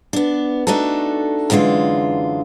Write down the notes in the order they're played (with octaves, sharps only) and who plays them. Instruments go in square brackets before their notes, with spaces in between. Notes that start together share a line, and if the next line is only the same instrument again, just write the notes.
[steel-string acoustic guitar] B3 D4
A3 D4 D#4 F#4 A4
F#2 D3 E3 G#3 F4